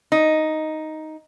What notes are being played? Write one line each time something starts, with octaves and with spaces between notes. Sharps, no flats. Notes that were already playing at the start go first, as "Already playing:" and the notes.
D#4